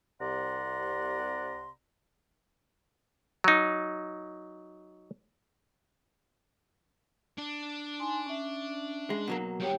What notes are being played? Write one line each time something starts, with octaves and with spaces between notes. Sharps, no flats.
C2 C3 D5 F#5 A#5 C6
F#3 D#4
D4
D#4 G#5 C6
C#4 E5
G#3
B2 F#3 A#3
G2 B3 G4 C#5 G5